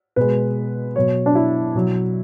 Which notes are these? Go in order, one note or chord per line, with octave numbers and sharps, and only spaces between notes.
B2 G#3 B4
B2 F#3 C#5
D4
E4
B2 F#3